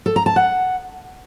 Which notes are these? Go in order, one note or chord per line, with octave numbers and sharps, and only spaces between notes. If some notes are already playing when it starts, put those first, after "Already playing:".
A4
A#5
A5
F#5